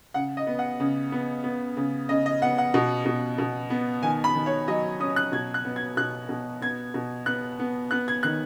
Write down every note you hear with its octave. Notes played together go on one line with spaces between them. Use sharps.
C#3 F#5
D#5
B3
F#5
C#3
B3
B3
C#3
C#3 D#5
D#5
B3 F#5
F#5
B2
B2
B2
B3
D#3 G#5
B5
D#3
C#5
F#3 D#5
C#4 D#6
F#6
B2 G#6
F#6
B3
G#6
B2 F#6
B2
B3 G#6
B2
B3 F#6
B3
B3 F#6
G#6
D#3 F#6